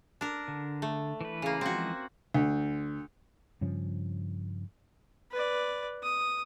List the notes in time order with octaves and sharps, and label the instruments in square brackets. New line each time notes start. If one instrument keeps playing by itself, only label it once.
[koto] D4 A#4
[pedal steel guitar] D3
[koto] A3
[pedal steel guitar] E3 B4
[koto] C#3 A#3
[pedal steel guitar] E3 F3 G#3 [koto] C4 F#4
[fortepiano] D2
[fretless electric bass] G2 C#3 F3 C#4
[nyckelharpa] B4 D5
D#6